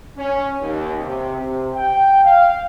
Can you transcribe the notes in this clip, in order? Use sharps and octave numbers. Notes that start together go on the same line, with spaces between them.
C#4
D#2
C3
C3
G5
F5